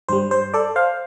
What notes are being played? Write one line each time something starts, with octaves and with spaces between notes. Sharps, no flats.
G2 G3 C5
C5
A4 D5
C5 F5